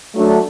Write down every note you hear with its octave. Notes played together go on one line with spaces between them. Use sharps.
F#3 A3 D4